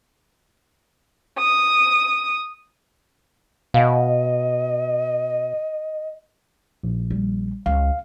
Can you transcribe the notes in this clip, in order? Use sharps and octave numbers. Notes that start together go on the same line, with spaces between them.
D#6
B2 D#5 F5 G#5
A#1
G3
C#2 F5